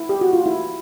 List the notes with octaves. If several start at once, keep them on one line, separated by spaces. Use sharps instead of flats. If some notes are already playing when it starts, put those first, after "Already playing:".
Already playing: E4
G4
F#4
F4
E4